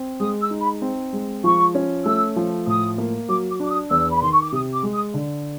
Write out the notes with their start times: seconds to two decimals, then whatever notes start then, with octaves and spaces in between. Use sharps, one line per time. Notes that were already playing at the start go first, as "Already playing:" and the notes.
Already playing: C4
0.20 G#3 D#6
0.41 E6
0.51 D#4
0.61 B5
0.82 C4
1.13 G#3
1.44 F3 C#6
1.75 C#4
2.05 A3 E6
2.36 F3
2.67 A2 D#6
2.98 A#3
3.29 F#3 D6
3.49 D6
3.60 D4 D6
3.70 D#6
3.91 E2 E6
4.11 B5
4.21 D#3 C6
4.32 C#6
4.42 D6
4.52 C3 D#6
4.73 D6
4.83 G#3
4.93 D#6
5.14 D3